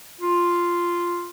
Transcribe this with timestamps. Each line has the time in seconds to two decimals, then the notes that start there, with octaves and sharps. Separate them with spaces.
0.21 F4